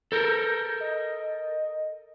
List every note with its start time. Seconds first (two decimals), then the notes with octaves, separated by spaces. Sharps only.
0.12 A4 A#4 G6
0.80 D#5